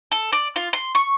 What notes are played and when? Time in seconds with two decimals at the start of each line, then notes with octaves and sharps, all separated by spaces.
0.11 A4
0.33 D5
0.56 F4
0.73 C6
0.95 C#6